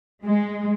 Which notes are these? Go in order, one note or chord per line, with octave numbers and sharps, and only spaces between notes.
G#3